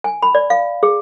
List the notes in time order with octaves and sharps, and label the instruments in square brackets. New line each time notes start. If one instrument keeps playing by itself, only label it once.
[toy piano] G#5
B5
D5
F5
G#4